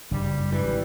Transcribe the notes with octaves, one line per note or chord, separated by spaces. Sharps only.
F#1 G2 G3
G#1 E3 G3